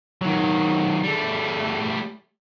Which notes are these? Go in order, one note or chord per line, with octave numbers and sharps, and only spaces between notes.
D#3 F#3
G3 A3